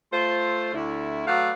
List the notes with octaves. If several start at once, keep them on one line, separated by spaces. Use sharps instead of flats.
A3 F4 C5
D2 D3 E4
F#3 A3 B3 D5 F5 F#5